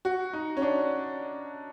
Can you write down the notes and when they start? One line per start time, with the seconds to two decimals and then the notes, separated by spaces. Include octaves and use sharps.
0.05 F#4
0.33 D#4
0.57 C#4
0.62 D4